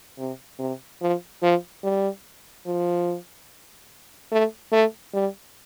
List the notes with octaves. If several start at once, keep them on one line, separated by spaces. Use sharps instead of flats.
C3
C3
F3
F3
G3
F3
A3
A3
G3